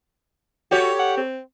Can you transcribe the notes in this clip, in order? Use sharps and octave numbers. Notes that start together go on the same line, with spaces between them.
F#4 G4 A4 C#5
F#5
C4